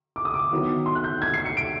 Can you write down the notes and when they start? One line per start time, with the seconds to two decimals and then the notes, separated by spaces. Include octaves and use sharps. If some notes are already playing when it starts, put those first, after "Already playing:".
0.16 D6
0.25 D#6
0.34 D6
0.51 D#3 F#3 B3 E4
0.86 C6
0.95 F#6
1.04 G6
1.22 G#6
1.34 C7
1.45 C#7
1.57 D7